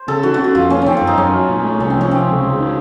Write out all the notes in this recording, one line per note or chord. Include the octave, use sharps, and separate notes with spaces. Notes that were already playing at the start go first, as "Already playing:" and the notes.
Already playing: C5
C#3 A4
D#3 F#4
F#4
C#4
F#4
F2 F4
A#3 C#4
D#3 C4 C#4
F#2 F4
D#4
F#2 C#4
F#3
A#2
A3
C2 C#4
C4
F3 C#4
C3 C4
C#2
C#2
D#3